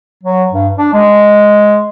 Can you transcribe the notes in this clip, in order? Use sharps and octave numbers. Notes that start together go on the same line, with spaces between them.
F#3
G2
D4
G#3